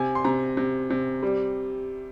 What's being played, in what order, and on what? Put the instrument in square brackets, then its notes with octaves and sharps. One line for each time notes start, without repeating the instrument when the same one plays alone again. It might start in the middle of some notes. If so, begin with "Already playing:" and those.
Already playing: [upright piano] C3 G#5
C6
C3 A#5
C3
C3
G3